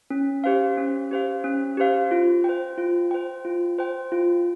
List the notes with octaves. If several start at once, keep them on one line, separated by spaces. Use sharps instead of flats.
C#4
G4 C5 F5
C#4
G4 C5 F5
C#4
G4 C5 F5
F4
C5 G5
F4
C5 G5
F4
C5 G5
F4